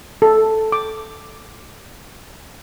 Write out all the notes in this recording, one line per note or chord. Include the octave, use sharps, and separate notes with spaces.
A4
D6